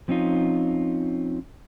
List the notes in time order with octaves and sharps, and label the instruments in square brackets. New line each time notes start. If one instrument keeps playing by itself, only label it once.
[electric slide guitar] F3 C4 C#4 D#4 F4